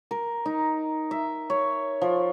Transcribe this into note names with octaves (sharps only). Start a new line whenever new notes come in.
A#4
D#4
E5
C#5
F3